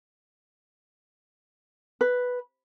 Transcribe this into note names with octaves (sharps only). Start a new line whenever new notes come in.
B4